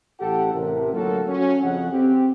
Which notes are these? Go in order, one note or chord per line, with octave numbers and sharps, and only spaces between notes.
A1 G4 A4 F#5
A1 C3 A#4
D2 F#3 A#3 F4 F#4 A4
F#3 C#4
F2 C#3 F#5
C4 G4